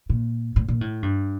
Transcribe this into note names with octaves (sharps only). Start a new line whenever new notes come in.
A#2
A2
A#2
A2
G2